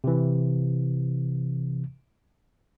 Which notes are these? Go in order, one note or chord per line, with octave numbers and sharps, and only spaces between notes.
C3 E3